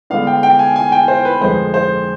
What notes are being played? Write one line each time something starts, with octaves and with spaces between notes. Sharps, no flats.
D3 G#3 B3 D4 F5
G5
G5
G#5
G#5
G5
C5
B4
F2 D3 G#3 C5
C5